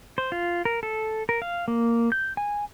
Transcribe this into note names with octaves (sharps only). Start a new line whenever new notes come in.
C5
F4
A#4
A4
A#4
F5
A#3
G6
G#5